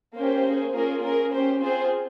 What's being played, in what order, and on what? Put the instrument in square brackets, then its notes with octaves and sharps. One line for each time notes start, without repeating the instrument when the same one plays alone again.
[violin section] A#3 C#4 G4 C5
A#3 C#4 G#4
A#3 C#4 F4 G#4 A#4
C#4 G#4 A#4
C#4 G4 C5
C4 F4 G#4 C5